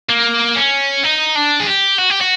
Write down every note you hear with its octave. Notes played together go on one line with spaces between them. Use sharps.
A#3
C#4
D#4
D4
G#4
G4
F#4
G4
F#4